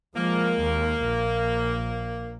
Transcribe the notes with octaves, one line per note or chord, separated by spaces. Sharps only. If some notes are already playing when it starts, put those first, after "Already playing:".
F3 G#3 A#3
D#2
A#1